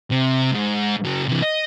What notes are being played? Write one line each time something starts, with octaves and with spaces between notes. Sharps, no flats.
C3
G#2
C#3 F#3
C3 E3
D#5